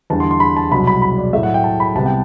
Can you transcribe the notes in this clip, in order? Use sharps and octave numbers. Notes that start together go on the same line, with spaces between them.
E2 D3 G3 A5
C6
C6
B5
A5
C2 B2 F#3 B5
B5
B5
D5
A2 F#3 A3 E5
F#5
G5
A5
B5
C2 C3 G3 B3 A5
G5